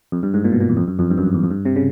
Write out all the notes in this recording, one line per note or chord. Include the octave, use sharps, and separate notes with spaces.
F2
G2
G#2
A#2
B2
A#2
E2
F2
F#2
F2
G2
F#2
F2
E2
F2
G2
C3
C#3